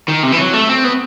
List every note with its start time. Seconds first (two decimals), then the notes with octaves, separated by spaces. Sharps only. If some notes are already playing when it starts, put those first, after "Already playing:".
0.08 D#3
0.23 C3
0.32 E3
0.38 F#3
0.53 A3
0.69 C4
0.84 B3